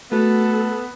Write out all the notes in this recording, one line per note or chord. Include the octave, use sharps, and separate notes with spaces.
A3 B3 F#4 A4